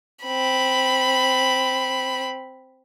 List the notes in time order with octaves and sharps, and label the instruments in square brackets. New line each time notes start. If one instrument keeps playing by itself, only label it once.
[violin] C4 B5